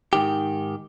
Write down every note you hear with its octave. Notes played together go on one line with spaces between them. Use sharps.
G#2 D#3 G4